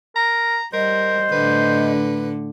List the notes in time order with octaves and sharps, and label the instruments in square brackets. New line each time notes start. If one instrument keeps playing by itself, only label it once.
[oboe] A#4 [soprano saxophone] A#5
[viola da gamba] G3 [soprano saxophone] A#4 [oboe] C5 [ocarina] D#5
[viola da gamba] A2 D3 [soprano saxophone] B4